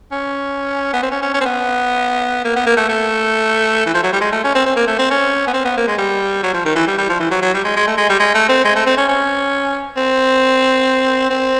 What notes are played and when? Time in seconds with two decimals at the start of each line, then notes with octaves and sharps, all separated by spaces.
0.12 C#4
0.93 B3
1.03 C4
1.11 C#4
1.22 C#4
1.34 C#4
1.41 C4
1.45 B3
2.45 A#3
2.56 B3
2.67 A#3
2.77 A3
2.89 A3
3.86 E3
3.94 F3
4.03 F#3
4.13 G3
4.21 G#3
4.32 A3
4.44 C#4
4.55 C4
4.66 C4
4.76 A#3
4.87 A3
4.99 C4
5.11 C#4
5.47 B3
5.54 C4
5.65 B3
5.77 A#3
5.88 G#3
5.98 G3
6.43 F#3
6.54 F3
6.65 D#3
6.75 E3
6.87 G3
6.98 G3
7.09 F3
7.20 E3
7.31 F#3
7.42 F#3
7.54 G3
7.65 G#3
7.76 G#3
7.87 A3
7.97 G#3
8.09 G3
8.20 G#3
8.35 A3
8.49 C4
8.65 G#3
8.76 A3
8.86 C4
8.97 C#4
9.09 C#4
9.97 C4
11.30 C4